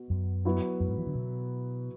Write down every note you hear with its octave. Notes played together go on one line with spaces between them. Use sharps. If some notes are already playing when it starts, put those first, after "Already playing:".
Already playing: B2
F#2
F#3 B3 E4
F#2
G#2
E3
D3
B2